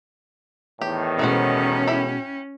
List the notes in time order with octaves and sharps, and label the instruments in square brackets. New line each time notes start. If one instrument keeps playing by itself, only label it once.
[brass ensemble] E2 A2 D#3 [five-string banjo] G4
[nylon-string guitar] B2 G#3 [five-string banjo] A3 B4 C5 [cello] C#4
[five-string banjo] E4 G4 B5